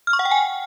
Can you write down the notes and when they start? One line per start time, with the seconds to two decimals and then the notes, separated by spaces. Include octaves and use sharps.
0.07 F6
0.13 C#6
0.19 F#5
0.25 G5
0.31 G#5